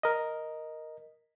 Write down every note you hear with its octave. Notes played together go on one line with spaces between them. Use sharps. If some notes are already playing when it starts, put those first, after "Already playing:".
A#4 D#5